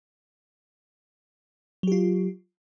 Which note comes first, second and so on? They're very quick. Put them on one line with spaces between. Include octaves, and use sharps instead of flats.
F#3 G4 F4